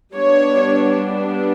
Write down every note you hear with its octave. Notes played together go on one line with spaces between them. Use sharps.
G3 B3 D4 C#5